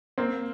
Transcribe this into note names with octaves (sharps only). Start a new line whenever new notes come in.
A#3 C4